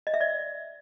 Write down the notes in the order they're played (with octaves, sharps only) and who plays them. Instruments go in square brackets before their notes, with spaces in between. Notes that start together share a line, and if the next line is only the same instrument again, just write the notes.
[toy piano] D#5
E5
D5